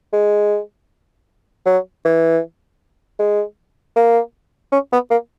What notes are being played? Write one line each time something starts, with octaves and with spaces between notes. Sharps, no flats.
G#3
F#3
E3
G#3
A#3
C#4
B3
A#3